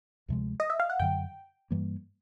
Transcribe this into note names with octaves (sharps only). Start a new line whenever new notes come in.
D2 C3 F3 G#3
D#5
E5
F5
F#5
F#2 D3 F#3 G5
G2 E3 G3 A#3